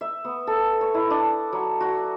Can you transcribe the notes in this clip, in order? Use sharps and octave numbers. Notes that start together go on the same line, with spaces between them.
E5
B3
A4
C#5
E4
D4
F#3
F#4